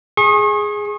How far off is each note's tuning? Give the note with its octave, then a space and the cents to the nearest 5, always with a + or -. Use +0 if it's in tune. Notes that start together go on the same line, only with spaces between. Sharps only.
G#4 +0 C#6 -40